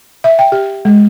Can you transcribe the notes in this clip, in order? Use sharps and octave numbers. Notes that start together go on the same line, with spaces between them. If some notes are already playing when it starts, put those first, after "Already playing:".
E5
G5
G4
G#3